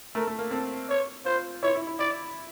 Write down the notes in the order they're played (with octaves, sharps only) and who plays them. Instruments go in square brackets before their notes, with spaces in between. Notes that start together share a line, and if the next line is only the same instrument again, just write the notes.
[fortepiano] A3 [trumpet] A#4
[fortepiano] A3
A#3
[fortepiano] C4 [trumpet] A4
[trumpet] C#5
[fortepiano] F4 [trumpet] C5
[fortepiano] E4 [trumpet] C#5
[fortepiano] E4
E4
[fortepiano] E4 [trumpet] D5